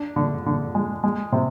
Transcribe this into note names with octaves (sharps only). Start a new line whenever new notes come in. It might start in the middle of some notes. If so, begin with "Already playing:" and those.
Already playing: D4
D3
D3
G#3
G#3
C3